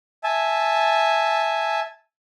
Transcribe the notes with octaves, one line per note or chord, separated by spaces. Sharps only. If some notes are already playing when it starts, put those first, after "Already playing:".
E5 G#5 A5